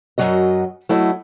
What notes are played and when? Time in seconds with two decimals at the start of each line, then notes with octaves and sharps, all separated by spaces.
0.18 F#2 B2 F#3 F#4 D#5
0.89 F#3 A3 E4 D#5